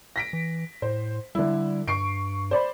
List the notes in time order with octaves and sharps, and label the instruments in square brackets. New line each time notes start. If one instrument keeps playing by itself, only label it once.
[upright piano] A#6 B6 D7
[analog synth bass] E3
[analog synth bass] A2 [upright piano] C5
[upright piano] D3 E4 [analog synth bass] G3
[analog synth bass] G2 [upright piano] C#6 C7 D7
[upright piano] C5 D5 B5